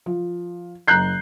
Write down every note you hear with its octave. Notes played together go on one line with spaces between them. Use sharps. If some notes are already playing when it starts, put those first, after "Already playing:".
F3
F#1 A#5 F#6 G6 C7